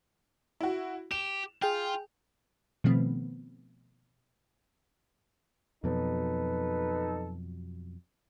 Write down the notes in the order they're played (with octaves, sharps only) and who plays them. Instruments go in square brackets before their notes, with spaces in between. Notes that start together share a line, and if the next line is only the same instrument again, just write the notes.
[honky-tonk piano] E4 F#4
[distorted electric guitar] G4 [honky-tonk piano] E7
[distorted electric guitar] F4 [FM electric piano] G#4 G5
[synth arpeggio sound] B2 D#3 F3 A3 B3 C4
[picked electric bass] F2 B2 F#3 [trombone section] D#4 A4 B4